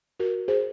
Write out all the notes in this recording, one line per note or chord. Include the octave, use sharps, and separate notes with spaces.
F#4 A#4
G#4 C5